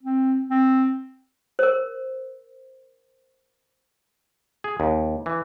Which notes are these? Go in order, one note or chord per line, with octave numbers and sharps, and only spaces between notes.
C4
C4
A#4 C5
G#4
D#2
E3